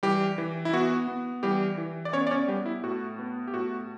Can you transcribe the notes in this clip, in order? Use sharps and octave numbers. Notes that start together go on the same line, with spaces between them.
E3 G3 G4
E3
E4
B3 F#4
B3
E3 G3 G4
E3
D5
B3 C#4 C#5
D5
C#4 C#5
G3 B3 G4
E4
A2 F#4
B3
G4
A2 F#4